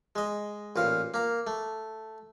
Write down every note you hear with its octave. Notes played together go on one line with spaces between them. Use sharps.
G#3 D#5
A1 A#2 F5
A#3 A#5
A3